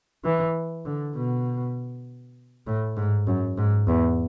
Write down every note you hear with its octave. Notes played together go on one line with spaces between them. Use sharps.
E3
D3
B2
A2
G#2
F#2
G#2
E2